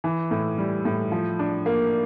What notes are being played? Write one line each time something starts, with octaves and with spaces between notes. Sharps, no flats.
E3
A2
G3
A2
F3
D4
A#3